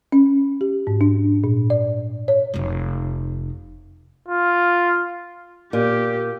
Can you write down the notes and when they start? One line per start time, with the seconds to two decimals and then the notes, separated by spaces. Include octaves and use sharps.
0.12 C#4
0.61 G4
0.87 G#2
1.01 D4
1.44 A#2
1.70 D5
2.28 C#5
2.54 F1 D#4
4.28 F4
5.73 A#2 G4